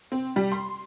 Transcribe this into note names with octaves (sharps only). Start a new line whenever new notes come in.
C4
G3
C6